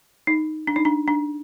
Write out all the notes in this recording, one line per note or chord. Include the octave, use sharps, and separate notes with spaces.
D#4
D4
D#4
D4
D4